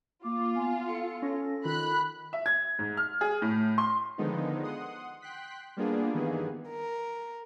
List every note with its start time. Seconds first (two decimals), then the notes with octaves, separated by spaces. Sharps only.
0.24 A#3 F4 D6
0.55 B3 G#5
0.88 A4 C#7
1.22 C#4 A#6
1.65 D#3 F4 B5 F#6
2.33 E5
2.46 G#6
2.79 G#2
2.97 F6
3.21 G#4
3.42 A2
3.78 C6
4.18 D3 D#3 F3 G#3 B3 D#4
4.63 F#5 C6 D#6
5.22 G5 C6 F#6 B6
5.77 G3 A#3 B3 D4 F4 G#4
6.13 G2 D#3 E3 A#3 B3 G#4
6.69 A#4